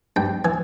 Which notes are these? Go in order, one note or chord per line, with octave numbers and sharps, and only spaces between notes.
G2 G5
E3 G#5